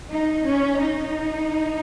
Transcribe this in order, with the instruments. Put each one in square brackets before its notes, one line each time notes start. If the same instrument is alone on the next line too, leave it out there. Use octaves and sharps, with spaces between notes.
[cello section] D#4
C#4
D#4